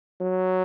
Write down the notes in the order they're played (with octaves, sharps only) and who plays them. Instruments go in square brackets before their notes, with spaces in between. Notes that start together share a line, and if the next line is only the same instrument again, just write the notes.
[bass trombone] F#3